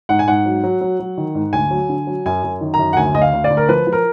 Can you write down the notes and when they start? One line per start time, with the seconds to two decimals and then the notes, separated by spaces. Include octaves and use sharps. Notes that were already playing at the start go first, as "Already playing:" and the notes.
0.09 G#2 F#5
0.19 G#5
0.27 G#2 F#5
0.46 F#3
0.64 F#3
0.81 F#3
1.00 F#3
1.17 D#3
1.35 G#2
1.53 D2 G#5
1.71 F#3
1.89 D3
2.07 F#3
2.26 F#2 G#5
2.44 F#2
2.61 D#3
2.74 A#5
2.79 F#2
2.93 F#5
2.96 D2 G#5
3.14 D2 D#5
3.22 F5
3.33 D2
3.44 D5
3.50 D2
3.57 A#4
3.69 F3 B4
3.87 F3
3.93 A#4